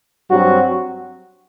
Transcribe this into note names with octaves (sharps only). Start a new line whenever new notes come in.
G2 F#3 C4 F#4